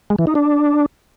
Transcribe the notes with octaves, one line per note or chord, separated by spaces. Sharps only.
G#3
E3
D#4
D4